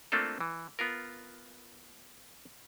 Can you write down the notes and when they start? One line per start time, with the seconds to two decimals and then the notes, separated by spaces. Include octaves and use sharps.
0.12 A3 A#3 C4 D4 F4 A4
0.41 E3
0.79 B3 F4 A#4